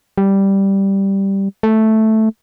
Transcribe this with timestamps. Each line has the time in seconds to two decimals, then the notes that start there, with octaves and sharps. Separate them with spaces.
0.18 G3
1.63 A3